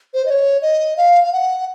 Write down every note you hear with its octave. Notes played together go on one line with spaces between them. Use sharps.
C5
D#5
C#5
D#5
F5
F5
F#5